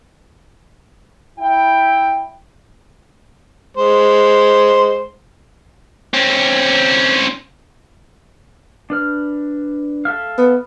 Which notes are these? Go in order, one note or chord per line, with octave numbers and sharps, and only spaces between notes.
E4 G5
G#3 C5
C4 C#4
D4 B4 F6
A4 E5 F5
B3